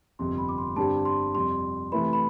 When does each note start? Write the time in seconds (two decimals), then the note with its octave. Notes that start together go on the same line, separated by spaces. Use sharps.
0.19 G1 F2 C3 C6
0.38 B5
0.49 D6
0.58 C6
0.76 G2 D3 G3 C4 G4 A5
1.05 C6
1.35 F2 C3 G3 C6
1.92 C3 E3 A3 E4 B4 B5
2.13 B5